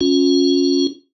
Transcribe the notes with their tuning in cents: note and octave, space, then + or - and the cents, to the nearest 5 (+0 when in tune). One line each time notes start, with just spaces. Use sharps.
C#4 +0 F4 +40